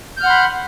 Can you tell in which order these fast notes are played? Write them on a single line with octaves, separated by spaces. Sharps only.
G6 F6 F#5 C6 B5